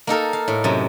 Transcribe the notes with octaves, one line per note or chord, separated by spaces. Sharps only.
A#3 D#4 A4 A#4
F5
A2
F#2 C3